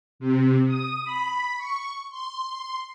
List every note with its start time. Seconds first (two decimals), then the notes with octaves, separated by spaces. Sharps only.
0.20 C3
0.66 D#6
1.04 B5
1.57 C#6
2.10 C6